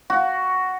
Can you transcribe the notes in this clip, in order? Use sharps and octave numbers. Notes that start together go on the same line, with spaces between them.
F#4